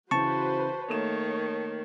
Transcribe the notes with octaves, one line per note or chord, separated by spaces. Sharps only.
C#3 E3 F#4 B4 C5 A5 C#6
D#3 A3 A#3 C#5 E7